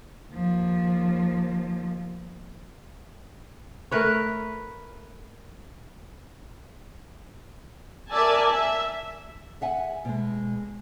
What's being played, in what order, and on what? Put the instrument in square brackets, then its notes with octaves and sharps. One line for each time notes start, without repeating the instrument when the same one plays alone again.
[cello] D#2 F3
[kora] A3 A#4 B4 C#5
[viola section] A#4 D5 E5 G#5 A5
E5
[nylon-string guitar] G#4 E5 F#5 G#5
B2 G#3